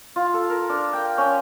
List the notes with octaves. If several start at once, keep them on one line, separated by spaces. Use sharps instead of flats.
F4
A4
A#4
D4
G5
C#4